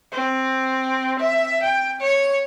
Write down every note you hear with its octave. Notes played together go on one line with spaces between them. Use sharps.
C4
E5
G5
C#5